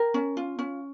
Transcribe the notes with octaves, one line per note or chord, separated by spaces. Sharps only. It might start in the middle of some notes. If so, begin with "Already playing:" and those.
Already playing: A#4 G5
C#4
F4
C#4